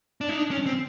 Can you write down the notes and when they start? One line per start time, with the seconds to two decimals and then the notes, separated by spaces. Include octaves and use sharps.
0.21 D4
0.29 D#4
0.37 D4
0.51 C#4
0.66 C4